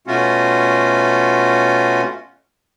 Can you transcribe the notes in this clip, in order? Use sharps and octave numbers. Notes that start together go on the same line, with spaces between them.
B2 A3 C#4 F4 F#4